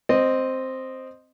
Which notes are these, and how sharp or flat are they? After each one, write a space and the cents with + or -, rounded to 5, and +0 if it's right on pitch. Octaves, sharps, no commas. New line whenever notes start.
C4 +0 D#5 -10